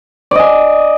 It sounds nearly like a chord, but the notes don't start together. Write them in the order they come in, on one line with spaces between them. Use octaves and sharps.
D5 D#5 G#5